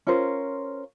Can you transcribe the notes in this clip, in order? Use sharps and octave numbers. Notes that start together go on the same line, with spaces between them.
C#4 F4 A#4 C5